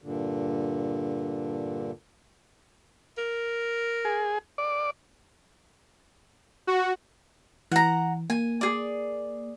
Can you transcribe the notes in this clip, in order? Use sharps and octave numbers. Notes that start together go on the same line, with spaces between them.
G2 A#2 D3
A#4
G#4
D5
F#4
E3 F#5 A#5
A#3 G#5
G#4 D5